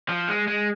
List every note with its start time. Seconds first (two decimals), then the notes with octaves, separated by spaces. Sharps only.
0.09 F3
0.28 G#3
0.48 G#3